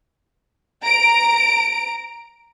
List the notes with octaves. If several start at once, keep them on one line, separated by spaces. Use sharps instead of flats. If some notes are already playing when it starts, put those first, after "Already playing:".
A#5 D7